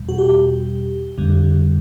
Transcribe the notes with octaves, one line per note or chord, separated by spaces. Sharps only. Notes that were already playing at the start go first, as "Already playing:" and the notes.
Already playing: E2 B2 G3
F#4
G4
F2 D3 G3